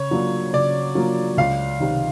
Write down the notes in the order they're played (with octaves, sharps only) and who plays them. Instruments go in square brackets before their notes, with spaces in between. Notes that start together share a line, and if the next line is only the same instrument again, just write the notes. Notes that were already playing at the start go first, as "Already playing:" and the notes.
Already playing: [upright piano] C#3 [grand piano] C#5
[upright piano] F#3 A#3 D4 F4
[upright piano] C#3 [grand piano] D5
[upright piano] F#3 A#3 D4 F4
[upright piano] C#2 [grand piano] F5
[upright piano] C3 D#3